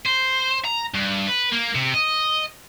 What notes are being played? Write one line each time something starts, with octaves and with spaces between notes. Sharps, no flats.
C5
A#5
G2
B4
A#3
C3
D#5